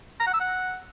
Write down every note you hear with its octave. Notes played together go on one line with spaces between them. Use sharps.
A#5
F#5
E6
F#5